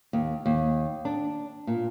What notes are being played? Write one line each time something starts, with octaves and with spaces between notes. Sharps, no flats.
D#2
D#2
D4
A#2